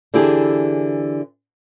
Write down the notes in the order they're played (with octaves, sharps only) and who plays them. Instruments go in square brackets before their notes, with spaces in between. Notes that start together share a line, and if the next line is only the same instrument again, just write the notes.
[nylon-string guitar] D3 E3 E4 G4 G#4